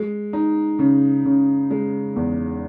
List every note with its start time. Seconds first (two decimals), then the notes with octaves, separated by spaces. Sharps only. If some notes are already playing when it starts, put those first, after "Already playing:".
Already playing: G#3
0.33 D#4
0.79 C#3
1.25 C#3
1.71 G#3
2.16 E2